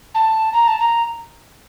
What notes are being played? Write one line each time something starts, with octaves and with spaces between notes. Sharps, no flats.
A5
A#5
A5
A#5